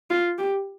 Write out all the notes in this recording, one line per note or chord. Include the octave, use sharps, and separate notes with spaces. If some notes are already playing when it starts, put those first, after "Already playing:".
F4
G4